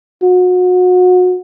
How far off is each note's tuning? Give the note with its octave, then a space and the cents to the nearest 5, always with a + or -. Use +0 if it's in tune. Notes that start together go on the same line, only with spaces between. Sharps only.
F#4 -30